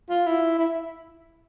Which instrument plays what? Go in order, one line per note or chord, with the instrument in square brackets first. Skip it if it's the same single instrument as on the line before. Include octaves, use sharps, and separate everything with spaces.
[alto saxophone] F4
E4
E4